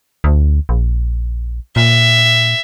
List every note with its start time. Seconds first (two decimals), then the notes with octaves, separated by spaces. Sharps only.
0.24 D2
0.69 A#1
1.76 A#2 E5